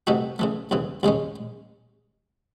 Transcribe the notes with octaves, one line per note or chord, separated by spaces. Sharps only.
C3 E3 A3 D#4 F#4
C#3 E3 A3
D#2 C#3 E3
D#2 C#3 G#3 C#4